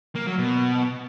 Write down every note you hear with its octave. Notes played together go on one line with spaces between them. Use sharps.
A#3
F#3
B2